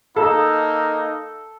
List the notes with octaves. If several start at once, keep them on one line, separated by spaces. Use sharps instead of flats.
A#3 D#4 A4